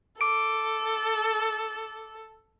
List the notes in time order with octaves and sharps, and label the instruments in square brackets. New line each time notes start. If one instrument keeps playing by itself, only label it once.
[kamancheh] A4 [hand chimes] D6 D7